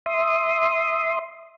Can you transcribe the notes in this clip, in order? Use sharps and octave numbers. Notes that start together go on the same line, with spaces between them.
E5 C6 D#6